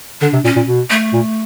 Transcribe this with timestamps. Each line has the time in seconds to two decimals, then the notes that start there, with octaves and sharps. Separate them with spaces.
0.21 D3 D4
0.33 C3
0.44 A#2 C#4
0.56 A#2
0.67 B2
0.90 A3
1.13 A#2